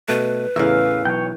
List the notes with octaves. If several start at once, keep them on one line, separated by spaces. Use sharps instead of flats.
B2 A3 B4
E2 A2 C#3 E3 A#4 E5 F5
B1 C#5 G5